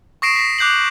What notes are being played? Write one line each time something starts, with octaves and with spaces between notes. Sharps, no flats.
C#6 D#6 A#6 C7 D7 E7
A#6 B6
D6 F#6 G6 C7 F#7